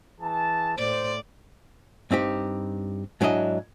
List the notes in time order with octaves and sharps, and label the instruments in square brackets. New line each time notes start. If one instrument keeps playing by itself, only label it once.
[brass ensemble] E3 G#4 A5
[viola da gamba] A2 D5 [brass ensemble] C5
[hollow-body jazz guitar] G2 C4 D#4 G4
G#2 F#3 D4 E4 D#5